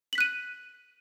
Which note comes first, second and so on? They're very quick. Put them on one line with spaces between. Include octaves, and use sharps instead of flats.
F#7 B6 F#6 D#7